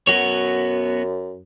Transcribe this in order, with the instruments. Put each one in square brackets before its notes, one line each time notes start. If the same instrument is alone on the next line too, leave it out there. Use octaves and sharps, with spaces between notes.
[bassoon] F#2 [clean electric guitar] B3 F#4 C#5